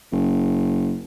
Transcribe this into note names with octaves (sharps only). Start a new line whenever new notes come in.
F#1